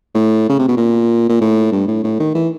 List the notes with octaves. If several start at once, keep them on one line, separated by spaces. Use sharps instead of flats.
A2
C#3
C3
B2
A#2
A#2
A2
G2
A2
A2
D#3
E3